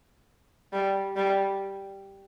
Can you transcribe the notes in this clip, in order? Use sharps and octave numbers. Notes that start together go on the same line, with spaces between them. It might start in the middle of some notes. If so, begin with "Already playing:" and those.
G3
G3